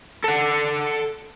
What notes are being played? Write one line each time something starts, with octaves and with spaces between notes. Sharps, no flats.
A4 F#5